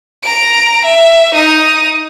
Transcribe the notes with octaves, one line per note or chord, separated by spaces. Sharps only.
A#5 D7
E5
D#4 D#6